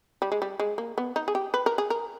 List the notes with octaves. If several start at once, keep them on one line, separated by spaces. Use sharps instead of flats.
G3
G#3
G3
G#3
A#3
B3
D#4
G#4
G4
B4
A#4
G#4
A#4